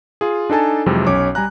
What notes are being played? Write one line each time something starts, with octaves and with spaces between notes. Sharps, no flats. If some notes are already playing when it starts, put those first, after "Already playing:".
F4 G#4
D4 D#4 A4 G#5 A5
F2 C3 E3 F#3 G#3 C4
B1 C#4 C#5 D6
G3 G#5 A#5 F#6